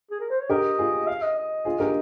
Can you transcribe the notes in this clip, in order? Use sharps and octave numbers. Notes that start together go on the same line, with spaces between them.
G#4
A#4
C5
C#5
G4 A#4 D#5
F4 G#4
F5
D#5
D#5
F4 G#4
G4 A#4